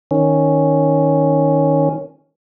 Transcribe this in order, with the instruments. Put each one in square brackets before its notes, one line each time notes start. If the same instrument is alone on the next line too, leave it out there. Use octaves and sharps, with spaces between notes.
[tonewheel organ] D#3 C#4